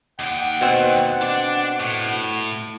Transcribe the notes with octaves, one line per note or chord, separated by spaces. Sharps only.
D#2 F#5 G5
B2 C4
D4 D5
A2